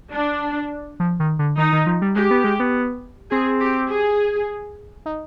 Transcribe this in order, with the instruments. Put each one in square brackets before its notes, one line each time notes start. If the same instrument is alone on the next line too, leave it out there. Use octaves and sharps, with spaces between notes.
[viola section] D4
[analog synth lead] F3
D#3
D3
[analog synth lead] D#3 [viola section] D#4
[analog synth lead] D#3
F3
G3
[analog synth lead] G#3 [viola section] G4
[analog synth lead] B3
G#3
B3
[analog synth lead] C4 [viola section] G#4
[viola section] G4
G#4
[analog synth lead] D#4